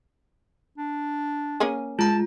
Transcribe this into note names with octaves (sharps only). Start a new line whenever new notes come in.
D4
A#3 C#4 G#4
G#3 F4 A5 A#5